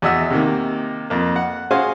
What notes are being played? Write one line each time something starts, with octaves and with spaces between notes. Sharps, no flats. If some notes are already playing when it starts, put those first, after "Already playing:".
E2 F#4 D#5 E5 F#5 E6
C3 D#3 A#3
F2 A#3
F#5
C#4 F#4 G#4 C5 F5 G#5